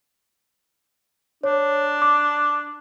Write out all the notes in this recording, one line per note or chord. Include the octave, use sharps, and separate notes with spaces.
D4 C#5
D6